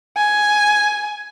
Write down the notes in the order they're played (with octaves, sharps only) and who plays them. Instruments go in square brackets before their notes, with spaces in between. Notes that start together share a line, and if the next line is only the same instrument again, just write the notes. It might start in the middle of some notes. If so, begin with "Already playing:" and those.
[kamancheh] G#5